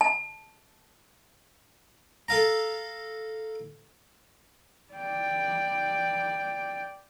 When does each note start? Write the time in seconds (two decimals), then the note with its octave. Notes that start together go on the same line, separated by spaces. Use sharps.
0.01 A5
2.28 A4 F5 A#5
4.93 D5 G5